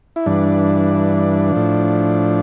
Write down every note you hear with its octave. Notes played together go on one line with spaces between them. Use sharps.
E4
G2 E3 D4
A2 F3